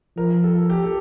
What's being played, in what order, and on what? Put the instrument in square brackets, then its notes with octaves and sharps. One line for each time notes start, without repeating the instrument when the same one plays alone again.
[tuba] F3 [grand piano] A#4
[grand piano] A4
G4
A4